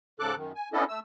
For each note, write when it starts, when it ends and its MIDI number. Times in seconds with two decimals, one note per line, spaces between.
0.20 0.35 44
0.20 0.35 49
0.20 0.35 69
0.20 0.35 86
0.20 0.35 90
0.36 0.52 42
0.36 0.52 51
0.55 0.69 80
0.73 0.84 59
0.73 0.84 61
0.73 0.84 62
0.73 0.84 64
0.73 0.84 69
0.73 0.84 75
0.89 1.00 57
0.89 1.00 88